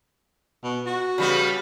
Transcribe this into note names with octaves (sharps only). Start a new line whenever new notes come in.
B2
F#4
C#3 G3 B3